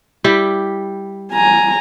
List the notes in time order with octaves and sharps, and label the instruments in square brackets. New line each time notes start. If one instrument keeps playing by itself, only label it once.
[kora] G3 E4 G4
[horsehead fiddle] G#5 A#5